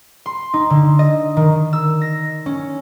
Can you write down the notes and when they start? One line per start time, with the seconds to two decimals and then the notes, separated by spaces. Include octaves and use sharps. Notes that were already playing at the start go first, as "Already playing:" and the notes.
0.26 C6
0.54 D#4
0.70 D3
0.99 D#5
1.37 D#3
1.73 E6
2.02 A#6
2.46 C#4